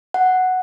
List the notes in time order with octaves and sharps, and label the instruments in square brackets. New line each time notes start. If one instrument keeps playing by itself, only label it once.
[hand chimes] F#5